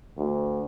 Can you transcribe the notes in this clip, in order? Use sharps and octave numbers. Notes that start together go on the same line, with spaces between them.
D2